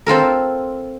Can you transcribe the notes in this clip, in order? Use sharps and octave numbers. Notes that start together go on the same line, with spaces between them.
C4 F4 A4 A#4